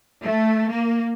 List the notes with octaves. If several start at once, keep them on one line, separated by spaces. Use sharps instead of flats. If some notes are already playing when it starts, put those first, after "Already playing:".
A3
A#3